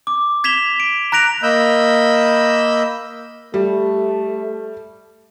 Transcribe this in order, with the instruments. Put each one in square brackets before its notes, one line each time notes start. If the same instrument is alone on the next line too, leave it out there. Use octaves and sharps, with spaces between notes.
[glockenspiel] D6
G#6 B6 E7 F7 G7
D7
A#5 F#6 A#6 D7 F7
[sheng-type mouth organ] A#3 D#5 B5 E6 G6
[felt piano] G3 [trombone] A3